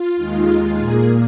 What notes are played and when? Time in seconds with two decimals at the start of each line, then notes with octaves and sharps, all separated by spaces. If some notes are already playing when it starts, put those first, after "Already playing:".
Already playing: F4
0.16 D#2 D#3 G#3
0.78 A#2 A#3 G#4